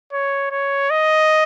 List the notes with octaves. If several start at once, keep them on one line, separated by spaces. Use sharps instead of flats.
C#5
C#5
D#5